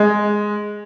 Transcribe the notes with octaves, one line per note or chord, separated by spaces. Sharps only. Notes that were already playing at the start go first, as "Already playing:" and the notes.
Already playing: G#3